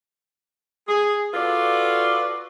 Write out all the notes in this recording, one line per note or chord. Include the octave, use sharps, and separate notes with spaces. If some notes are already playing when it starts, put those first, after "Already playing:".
G#4
F4 F#4 A4 B4 D5